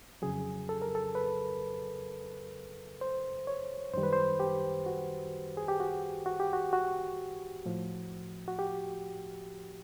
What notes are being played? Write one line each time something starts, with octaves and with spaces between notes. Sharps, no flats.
F2 C#3 F#3 G#4
A4
A#4
A4
B4
C5
C#5
F#2 D#3 G3 C5
B4
C5
G4
F#4
G#4
G4
F#4
F#4
G4
F#4
F#4
A2 F3
F#4
G4